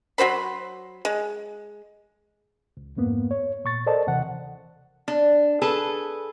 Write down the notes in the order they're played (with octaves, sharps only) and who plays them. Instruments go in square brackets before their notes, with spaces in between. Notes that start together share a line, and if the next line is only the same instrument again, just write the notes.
[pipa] F#3 F#4 C5 B5
G#3
[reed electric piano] C#2
F2 G#2 A#3 B3
C#5
A#2 C#6 A6
A4 A#4 C5 D5 D#5 A5
D#2 C3 E3 F#5
[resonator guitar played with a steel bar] D4
G#4 A4 B4